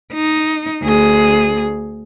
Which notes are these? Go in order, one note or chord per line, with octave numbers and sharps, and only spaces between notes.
D#4
D2 G#4